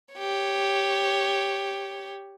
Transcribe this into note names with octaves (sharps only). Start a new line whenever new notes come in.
G4 C#5